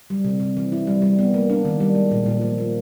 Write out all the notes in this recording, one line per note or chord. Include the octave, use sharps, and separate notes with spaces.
G3
C3
C3
E3
E4
G3
G3
B3
A#3
D4
D#3
G3
G#3
A#2
A#2
F3
A#3